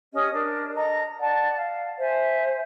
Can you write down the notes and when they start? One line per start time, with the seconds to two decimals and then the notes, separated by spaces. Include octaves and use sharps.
0.13 C#4 G4 D#5 D#6
0.33 D4 A#4
0.74 A4 D#5 A#5
1.19 D5 F#5 A5
1.56 F5
1.99 C5 E5 G#5